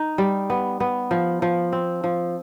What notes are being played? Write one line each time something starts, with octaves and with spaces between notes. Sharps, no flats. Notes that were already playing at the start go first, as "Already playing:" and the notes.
Already playing: D#4
G3
B3
B3
F3
F3
C4
F3